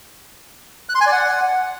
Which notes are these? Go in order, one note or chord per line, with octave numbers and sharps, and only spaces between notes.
F#6
C6
G#5
D5
F#5